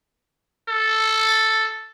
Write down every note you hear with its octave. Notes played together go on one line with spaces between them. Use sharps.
A4